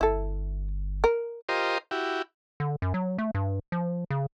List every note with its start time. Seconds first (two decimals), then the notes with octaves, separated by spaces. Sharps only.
0.01 G1 E4 A4
1.04 A#4
1.49 F4 G4 A#4 C5 D#5
1.91 E4 F#4 G4
2.60 D3
2.82 F#2
2.94 F#3
3.18 A3
3.35 G2
3.72 F3
4.10 C#3